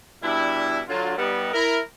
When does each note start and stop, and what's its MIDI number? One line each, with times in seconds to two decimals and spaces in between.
0.23 0.80 47
0.23 0.80 55
0.23 0.80 62
0.23 0.80 64
0.88 1.16 50
0.88 1.16 54
0.88 1.16 65
1.17 1.53 55
1.17 1.53 59
1.17 1.53 63
1.53 1.80 64
1.53 1.80 70